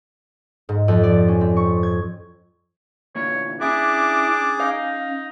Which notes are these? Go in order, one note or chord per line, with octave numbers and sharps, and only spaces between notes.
G#2
F2
D5
C#4
C4
C#6
G#6
D2 A#2 E3 C#5
C#4 D4 E4 G#4 D6
D#4 F5